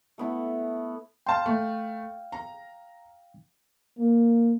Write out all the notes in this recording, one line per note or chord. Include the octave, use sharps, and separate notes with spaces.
A3 B3 E4
F5 G5 A5 C6
A3
A#5
A#3